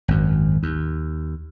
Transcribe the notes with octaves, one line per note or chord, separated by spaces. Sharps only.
G#1 F#2
D#2